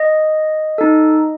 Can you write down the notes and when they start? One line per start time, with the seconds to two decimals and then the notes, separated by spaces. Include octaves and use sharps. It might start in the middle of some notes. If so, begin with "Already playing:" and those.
Already playing: D#5
0.78 D#4 A4